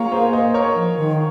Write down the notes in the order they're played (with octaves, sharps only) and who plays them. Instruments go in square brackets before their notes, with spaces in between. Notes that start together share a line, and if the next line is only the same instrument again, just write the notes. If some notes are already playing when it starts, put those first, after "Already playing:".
Already playing: [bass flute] A#3 [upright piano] F4 F#4 G#4 A#4 C#5
[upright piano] G#4 C5
C5 D#5
A#4 C#5
[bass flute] F3
D#3